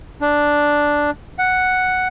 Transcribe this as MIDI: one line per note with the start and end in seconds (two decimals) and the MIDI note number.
0.21 1.10 62
1.39 2.08 78